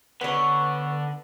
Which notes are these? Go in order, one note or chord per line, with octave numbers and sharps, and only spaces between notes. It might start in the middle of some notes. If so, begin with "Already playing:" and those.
D3 B3 B4 C#5